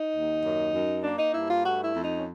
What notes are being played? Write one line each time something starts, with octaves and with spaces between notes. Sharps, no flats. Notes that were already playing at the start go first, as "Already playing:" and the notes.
Already playing: D#4
D#2
F#2
F#2
A#3 D4
D#4
G2 E4
F4
A3 F#4
E4
F2
D#4
C#4